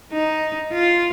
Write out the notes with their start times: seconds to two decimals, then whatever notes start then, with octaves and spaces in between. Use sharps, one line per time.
0.12 D#4
0.72 F4